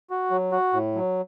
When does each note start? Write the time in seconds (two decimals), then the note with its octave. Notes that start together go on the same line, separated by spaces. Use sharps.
0.10 F#4
0.31 F#3
0.52 F#4
0.73 A2
0.95 F#3